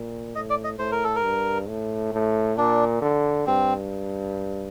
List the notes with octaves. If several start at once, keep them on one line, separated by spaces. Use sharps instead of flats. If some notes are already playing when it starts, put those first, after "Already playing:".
Already playing: A#2
A2 D#5
D5
D#5
A2 C5
A#4
A4
A#4
G2
A2
A2
A#2 D4
D3
G2 C4